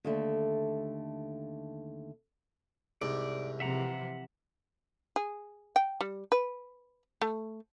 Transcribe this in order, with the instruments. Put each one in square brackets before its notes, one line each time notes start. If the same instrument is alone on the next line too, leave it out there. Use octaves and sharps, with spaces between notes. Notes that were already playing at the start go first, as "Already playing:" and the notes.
[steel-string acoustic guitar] D#2 D3 A3
[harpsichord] C2 G#2 [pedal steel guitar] D5
[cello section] C3 E3 F3 [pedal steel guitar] E5 F#5 A#5
[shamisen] G#4
G5
G3
B4
A3